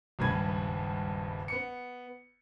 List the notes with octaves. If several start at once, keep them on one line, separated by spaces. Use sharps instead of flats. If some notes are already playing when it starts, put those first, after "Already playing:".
D#1 C#2 G2 B4 G#6
B3 C#7